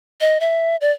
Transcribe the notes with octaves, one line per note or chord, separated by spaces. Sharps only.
D#5
E5
D5